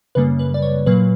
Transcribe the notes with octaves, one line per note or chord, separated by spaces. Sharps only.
F#2 C#3 G3 A#3 B4
B4
D5
C#5
A#2 F#3 A#3 B4